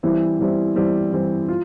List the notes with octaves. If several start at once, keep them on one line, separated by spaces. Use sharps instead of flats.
E3 G3 C4 E4
E3 G3 C4 E4
E3 G3 C4 E4
E3 G3 C4 E4
F4